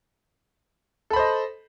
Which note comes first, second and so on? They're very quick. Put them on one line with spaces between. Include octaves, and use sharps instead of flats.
A4 B5 C5 D#5